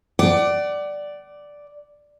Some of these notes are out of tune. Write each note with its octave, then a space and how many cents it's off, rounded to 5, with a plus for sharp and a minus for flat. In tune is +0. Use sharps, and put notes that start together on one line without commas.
D5 +0 F#5 +40